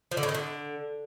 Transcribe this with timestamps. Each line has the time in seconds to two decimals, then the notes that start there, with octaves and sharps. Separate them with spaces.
0.11 F3
0.17 D3
0.23 A2
0.29 D#3
0.34 D3